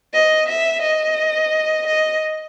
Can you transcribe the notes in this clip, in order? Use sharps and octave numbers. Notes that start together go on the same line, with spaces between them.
D#5
E5
D#5
D#5